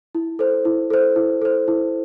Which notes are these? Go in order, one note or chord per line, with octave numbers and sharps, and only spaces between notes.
E4
A4 C5
E4
A4 C5
E4
A4 C5
E4